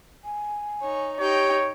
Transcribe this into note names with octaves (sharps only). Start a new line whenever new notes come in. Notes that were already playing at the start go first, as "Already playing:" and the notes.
G#5
D#4 C#5
D#4 G4 C#5 G5